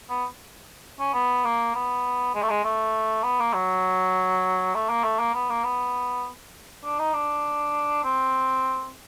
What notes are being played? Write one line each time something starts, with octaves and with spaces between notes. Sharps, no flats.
B3
C#4
B3
A#3
B3
G#3
A3
G#3
A3
B3
A#3
F#3
A3
A#3
A3
A#3
B3
A#3
B3
D4
D#4
D4
C4